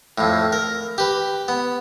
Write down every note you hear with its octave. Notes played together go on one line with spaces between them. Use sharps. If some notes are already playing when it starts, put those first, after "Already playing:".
F2 A2
A#4
G4 B4
B3